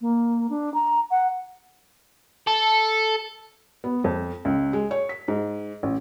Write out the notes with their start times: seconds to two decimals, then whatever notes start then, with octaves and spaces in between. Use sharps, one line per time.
0.01 A#3
0.50 D4
0.74 A#5
1.11 F#5
2.47 A4
3.84 B3
4.04 F2
4.45 C#2
4.73 G#3
4.91 C#5
5.09 B6
5.28 G#2
5.83 A1